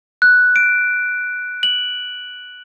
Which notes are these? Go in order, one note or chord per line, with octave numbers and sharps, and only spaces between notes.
F#6
D7
F#7